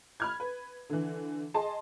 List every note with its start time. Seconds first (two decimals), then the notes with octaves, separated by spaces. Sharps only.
0.20 B5 F6 G#6
0.40 B4
0.89 D3 E3
1.54 G#4 D#5 A5 C6